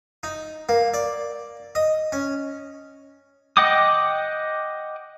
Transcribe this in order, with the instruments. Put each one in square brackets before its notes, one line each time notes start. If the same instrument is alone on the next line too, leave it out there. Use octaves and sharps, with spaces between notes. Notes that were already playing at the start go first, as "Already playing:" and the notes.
[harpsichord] D#4
A#3
D5
D#5
C#4
[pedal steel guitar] D#5 F#5 G5 D6 D#6